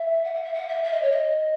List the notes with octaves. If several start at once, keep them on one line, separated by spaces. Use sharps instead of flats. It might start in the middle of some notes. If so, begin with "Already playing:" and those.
Already playing: E5
F#5
F#5
E5
F#5
E5
E5
D#5
C#5
D#5